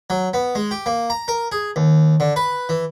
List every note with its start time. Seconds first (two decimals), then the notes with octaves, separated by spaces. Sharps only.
0.10 F#3
0.34 B3
0.55 G#3
0.71 G4
0.86 A#3
1.10 A#5
1.28 A#4
1.52 G#4
1.76 D#2
2.20 D3
2.36 B4
2.69 E3